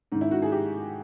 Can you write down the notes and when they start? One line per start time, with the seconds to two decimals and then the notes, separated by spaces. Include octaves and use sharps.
0.12 G#2 D#3
0.21 E4
0.31 F#4
0.42 G#4
0.52 G4